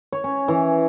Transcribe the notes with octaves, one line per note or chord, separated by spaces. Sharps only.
C#5
C#4
E3